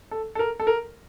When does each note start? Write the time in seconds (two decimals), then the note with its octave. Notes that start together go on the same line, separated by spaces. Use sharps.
0.11 A4
0.35 A4
0.39 A#4
0.60 A4
0.67 A#4